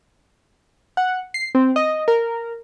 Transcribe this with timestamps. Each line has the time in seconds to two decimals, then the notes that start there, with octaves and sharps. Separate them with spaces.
0.97 F#5
1.34 C7
1.55 C4
1.76 D#5
2.08 A#4